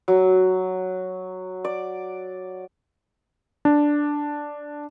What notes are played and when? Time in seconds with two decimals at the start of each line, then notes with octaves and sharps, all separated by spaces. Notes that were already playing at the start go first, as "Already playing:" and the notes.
0.08 F#3
1.65 D5
3.65 D4